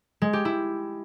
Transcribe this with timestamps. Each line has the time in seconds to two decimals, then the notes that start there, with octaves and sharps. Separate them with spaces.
0.22 G#3
0.33 G4
0.45 E4